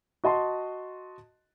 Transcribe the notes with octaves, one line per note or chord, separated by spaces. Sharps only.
F#4 D#5 A5 C6